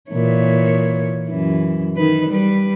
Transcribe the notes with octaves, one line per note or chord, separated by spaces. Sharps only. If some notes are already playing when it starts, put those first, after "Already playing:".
A#2 E3 C#5
F#2 E3
D#3 D#4 B4
G3 B4